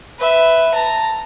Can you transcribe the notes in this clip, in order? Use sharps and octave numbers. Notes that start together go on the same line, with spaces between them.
B4 E5
A5 A#5